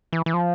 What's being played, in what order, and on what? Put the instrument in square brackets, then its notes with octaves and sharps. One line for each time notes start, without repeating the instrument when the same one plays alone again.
[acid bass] E3
E3
F3